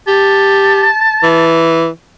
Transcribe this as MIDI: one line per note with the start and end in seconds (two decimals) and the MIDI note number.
0.07 0.87 67
0.07 1.66 81
1.23 1.88 52